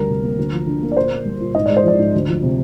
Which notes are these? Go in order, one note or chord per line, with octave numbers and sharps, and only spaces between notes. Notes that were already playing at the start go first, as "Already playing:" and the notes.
Already playing: D2 G3 A#4
C3
A#3
D2
F3
D3
A#3
D5
A#2 C5
A#3
G3
A#2
G#2 D#5
G#3 D5
C5
F3 D5
G#2
D2
F3
C3